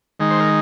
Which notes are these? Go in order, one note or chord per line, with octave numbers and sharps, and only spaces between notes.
D#3 G#3 D#4
C5
A#4